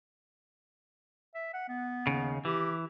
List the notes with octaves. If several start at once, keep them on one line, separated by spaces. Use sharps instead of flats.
E5
F#5
B3
D#2 C#3
E3 G4